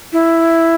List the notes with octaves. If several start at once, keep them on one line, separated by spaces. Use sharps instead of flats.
E4